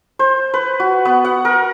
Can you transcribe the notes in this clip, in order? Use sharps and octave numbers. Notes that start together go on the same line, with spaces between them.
C5
B4
F#4
B3
F#5
A#4